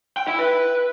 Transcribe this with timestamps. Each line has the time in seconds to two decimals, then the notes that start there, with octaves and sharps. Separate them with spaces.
0.17 G5
0.28 E4
0.39 B4